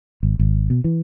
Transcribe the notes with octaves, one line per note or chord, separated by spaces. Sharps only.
G#1
G#1
B2
E3